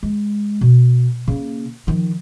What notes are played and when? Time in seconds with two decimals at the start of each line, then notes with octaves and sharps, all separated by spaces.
0.03 G#3
0.61 B2
1.28 C#3 A#3
1.87 D#3 F3